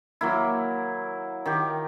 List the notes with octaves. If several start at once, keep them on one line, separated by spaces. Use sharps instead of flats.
F#3 A#3 E4
D#3 G4